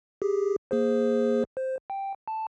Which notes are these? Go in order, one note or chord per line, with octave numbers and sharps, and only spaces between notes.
G4 G#4
A#3 G#4 C5
C5
G5
A5